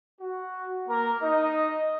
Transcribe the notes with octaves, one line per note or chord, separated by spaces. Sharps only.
F#4
A#3 A#4
D#4 D#5